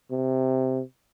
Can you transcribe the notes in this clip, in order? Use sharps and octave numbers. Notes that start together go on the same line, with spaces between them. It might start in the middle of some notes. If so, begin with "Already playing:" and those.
C3